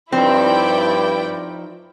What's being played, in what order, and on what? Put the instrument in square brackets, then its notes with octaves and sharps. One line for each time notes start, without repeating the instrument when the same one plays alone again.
[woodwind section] G2 [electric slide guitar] F3 D#4 [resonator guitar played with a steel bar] C4 [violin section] E4 D5 G5